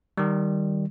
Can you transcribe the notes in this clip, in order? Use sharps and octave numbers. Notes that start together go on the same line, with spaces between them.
D#3 G3